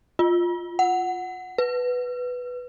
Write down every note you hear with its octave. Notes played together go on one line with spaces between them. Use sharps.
F4
F#5
B4